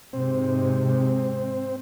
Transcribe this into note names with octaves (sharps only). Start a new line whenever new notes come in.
G#2 C3 G#3 C4